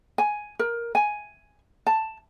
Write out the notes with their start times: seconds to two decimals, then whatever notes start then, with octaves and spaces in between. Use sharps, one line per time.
0.18 G#5
0.59 A#4
0.95 G#5
1.87 A5